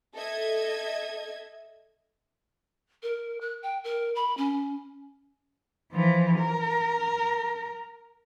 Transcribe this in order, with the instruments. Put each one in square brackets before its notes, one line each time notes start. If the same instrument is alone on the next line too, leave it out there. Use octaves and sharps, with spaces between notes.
[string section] A4 D#5 E5 G#6
[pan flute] A#4
F#6
G5
A#4
B5
C#4
[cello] E3 F3
A#4